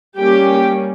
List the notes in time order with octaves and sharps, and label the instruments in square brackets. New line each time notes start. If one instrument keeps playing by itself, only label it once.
[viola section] G3 A#3 C#4 G4 G5